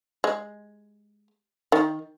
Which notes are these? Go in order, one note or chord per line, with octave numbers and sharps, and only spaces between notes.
G#3
D#3